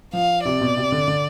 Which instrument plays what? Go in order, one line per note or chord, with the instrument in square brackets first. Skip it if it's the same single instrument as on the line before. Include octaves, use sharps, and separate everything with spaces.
[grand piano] F3 [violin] F5
[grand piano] C3 [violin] D5
[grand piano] B2
C3
D3
D3